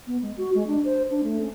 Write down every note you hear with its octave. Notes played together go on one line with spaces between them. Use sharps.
B3
G#3
F#4
G#3
D4
C5
D4
A3
C#4